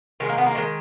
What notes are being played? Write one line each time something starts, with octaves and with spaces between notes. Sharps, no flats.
D#3 G#3 C#4
A#3
B3
A#3
D#3 G#3